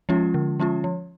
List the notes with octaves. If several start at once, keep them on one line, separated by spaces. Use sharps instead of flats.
F3 G#3 C#4 F4
D3
F3 G#3 C#4 F4
F3